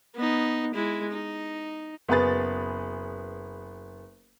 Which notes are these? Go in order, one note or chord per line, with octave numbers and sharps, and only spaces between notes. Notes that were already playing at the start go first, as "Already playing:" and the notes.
B3 D#4
G#3 E4
D#4
F#1 B3 G#4 B4 A6